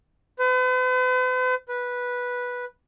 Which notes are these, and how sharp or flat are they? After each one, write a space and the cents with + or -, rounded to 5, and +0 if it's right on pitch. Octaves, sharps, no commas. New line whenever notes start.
B4 +45
B4 -10